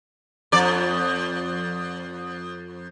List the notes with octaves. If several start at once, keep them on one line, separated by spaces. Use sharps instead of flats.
F2 D5